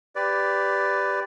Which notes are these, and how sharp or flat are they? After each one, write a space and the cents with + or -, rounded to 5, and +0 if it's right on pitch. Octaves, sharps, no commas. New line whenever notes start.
G4 +5 B4 +15 D5 -5